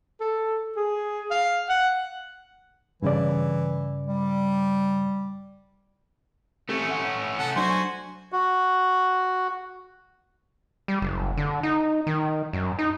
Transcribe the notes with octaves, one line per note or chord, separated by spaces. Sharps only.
A4
G#4
F5
F#5
G2 C#3 E3 D5
G3
A3 C4 C#4 G4 A4
E5 F#5
C3 A4 F#5
F#3 D4 F#4 C5 G#5
F#4
G3
F#1
D3
D#4
D#3
F#2
D#4